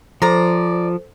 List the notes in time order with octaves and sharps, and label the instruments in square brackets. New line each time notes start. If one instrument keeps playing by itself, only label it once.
[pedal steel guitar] F3 [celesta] A4 C5 [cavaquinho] D5 A#5